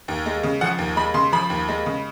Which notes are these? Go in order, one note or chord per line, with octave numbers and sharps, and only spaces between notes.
D#2
G#3
C#3
F3 F#5
D#2
G#3 B5
C#3 C6
F3 B5
D#2
G#3
C#3